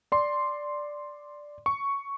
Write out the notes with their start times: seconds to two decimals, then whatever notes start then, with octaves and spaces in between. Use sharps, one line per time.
0.12 D5 C6
1.66 C#6